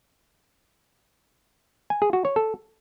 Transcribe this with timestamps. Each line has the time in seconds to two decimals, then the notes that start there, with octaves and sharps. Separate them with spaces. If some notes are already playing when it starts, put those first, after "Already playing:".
1.90 G#5
2.02 G#4
2.13 F#4
2.25 C#5
2.36 A4